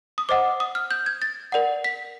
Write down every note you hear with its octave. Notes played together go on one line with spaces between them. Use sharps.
D#6
C5 D#5 F#5 D6
D#6
F6
G6
G#6
A6
A#4 D5 F#5
B6